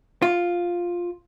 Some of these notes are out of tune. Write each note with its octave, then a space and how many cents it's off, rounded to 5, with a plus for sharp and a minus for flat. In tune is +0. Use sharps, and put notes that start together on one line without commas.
F4 +5